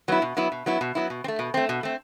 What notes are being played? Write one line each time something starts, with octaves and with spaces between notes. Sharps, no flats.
F#3 B3 E4
B2
F#3 B3 E4
B2
F#3 B3 E4
B2
F#3 B3 E4
B2
C4
A3
B2
A3 C4
B2
A3 C4